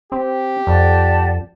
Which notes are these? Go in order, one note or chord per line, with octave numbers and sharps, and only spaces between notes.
C4 G4
F2 D5 F#5 A5